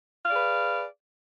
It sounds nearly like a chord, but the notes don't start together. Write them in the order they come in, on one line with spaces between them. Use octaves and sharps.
F5 D5 G#4 B4